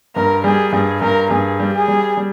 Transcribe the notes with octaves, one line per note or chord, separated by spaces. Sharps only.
G2 A#4
G3 G#4
G2 G#4
G2 A#4
G2 G#4
G3
G#4
G3
G3